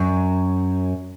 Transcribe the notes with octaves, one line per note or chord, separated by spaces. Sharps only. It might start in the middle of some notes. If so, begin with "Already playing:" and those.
Already playing: F#2